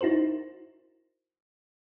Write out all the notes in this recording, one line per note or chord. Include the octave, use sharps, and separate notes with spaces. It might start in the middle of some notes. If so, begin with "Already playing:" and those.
D#4 E4 F#4 A#4 C5